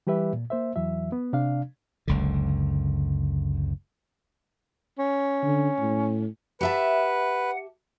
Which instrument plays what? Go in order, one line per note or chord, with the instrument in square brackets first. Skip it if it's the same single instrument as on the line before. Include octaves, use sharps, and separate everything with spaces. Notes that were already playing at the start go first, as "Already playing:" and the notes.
[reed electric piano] E3 G3 G4 B4 E5
A#2
A#3 C5 E5
E2 E3 F#3 E5
B3
C3 D4 D5 F5
[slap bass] F#1 C#2 D3
[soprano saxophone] C#4
[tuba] D3
A2
[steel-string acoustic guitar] G4 E5 A5 [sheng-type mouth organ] B4 [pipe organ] F#5